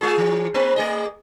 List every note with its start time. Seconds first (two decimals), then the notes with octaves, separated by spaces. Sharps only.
0.01 G#3 F4 G#4
0.18 E3
0.54 A#3 C4 B4
0.76 A3 G#4 D#5